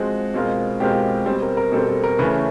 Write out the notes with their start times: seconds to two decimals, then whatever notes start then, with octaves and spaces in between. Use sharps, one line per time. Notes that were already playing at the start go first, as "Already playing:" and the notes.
Already playing: F3 G#3 C4 F#4
0.34 B2 G#3 C4 F4 A#4
0.80 B2 G#3 C4 F4 G4 A#4
1.26 B2 G3 C4 G#4
1.42 A#4
1.57 A#4
1.72 B2 G3 C4 A4
1.88 A4
2.04 A#4
2.19 C#3 E3 A3 C#4 B4